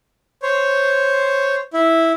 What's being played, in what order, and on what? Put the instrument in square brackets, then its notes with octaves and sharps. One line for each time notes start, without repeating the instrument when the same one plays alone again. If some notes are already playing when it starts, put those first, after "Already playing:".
[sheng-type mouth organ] C5 C#5
E4